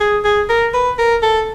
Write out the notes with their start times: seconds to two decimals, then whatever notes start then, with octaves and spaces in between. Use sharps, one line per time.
0.01 G#4
0.25 G#4
0.49 A#4
0.74 B4
0.99 A#4
1.23 A4